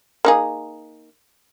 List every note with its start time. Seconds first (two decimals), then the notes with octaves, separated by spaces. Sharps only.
0.25 A#3 D#4 G#4